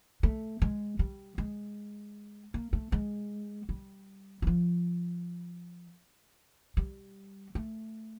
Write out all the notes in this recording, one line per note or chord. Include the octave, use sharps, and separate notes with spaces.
A3
G#3
G3
G#3
A#3
A3
G#3
G3
F#3
F3
G3
A3